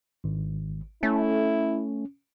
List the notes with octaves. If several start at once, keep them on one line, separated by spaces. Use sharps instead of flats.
G#1
A3 C#4 E4